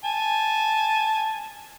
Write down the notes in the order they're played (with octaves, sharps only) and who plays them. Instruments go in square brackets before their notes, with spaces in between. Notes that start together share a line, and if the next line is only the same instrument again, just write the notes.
[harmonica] G#5 A5